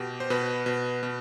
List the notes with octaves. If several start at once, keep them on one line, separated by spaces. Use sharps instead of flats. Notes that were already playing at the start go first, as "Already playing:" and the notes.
Already playing: B2 G4
C5
B2 B4
B2
B2